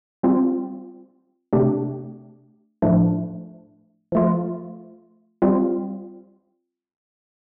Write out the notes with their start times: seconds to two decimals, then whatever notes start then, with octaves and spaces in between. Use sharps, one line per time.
0.23 G3 C4 F4
1.53 C3 A3 D4 G4
2.82 A2 F3 A3 D4
4.12 F3 A3 F4
5.42 G3 C4 F4